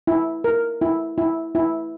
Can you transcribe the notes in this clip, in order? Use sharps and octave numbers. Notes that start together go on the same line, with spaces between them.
E4
A#4
E4
E4
E4